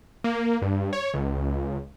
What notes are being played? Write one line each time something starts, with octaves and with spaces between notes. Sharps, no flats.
A#3
G2
C#5
C#2